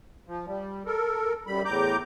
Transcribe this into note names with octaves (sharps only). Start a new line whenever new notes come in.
F3
G3
A4 A#4
F#2 G3 B5
E2 A2 A#5 D6 G6